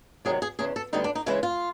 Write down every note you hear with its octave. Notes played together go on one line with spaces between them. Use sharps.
E2 C3 D#3 F#3 G#4
G#4
E2 C#3 E3 G#4
A4
D2 D3 G3 B3 D#4
D4
D#4
C#3 E3 G#3 C#4 E4
F4